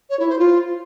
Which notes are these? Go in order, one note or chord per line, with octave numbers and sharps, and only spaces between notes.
C#5
E4
C5
F4